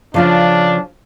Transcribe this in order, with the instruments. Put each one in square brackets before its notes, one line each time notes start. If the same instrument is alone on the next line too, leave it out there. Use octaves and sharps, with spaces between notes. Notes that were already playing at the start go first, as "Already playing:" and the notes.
[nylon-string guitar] C#3 F3 F4 [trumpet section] D4